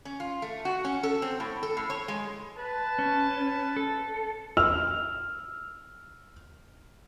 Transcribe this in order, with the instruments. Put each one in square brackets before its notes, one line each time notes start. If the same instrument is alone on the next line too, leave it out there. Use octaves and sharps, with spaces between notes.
[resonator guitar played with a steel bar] C#4
F4
A3
F#4
C#4
A4
C4
A2
A4
A2
C#5
G#3
[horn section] B4 A5
[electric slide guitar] C#4
A4
[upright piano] E6 F6 F7